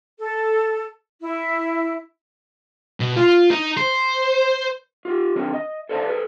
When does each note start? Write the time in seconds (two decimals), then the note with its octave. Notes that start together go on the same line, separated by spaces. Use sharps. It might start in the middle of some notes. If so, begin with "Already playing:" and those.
0.19 A4
1.21 E4
3.00 B2
3.16 F4
3.51 D#4
3.77 C5
5.05 F4 G4
5.35 D#3 C4 D4 A#4
5.53 D#5
5.89 A4 C5 D5 F5 A5
6.06 G#4 A4 B4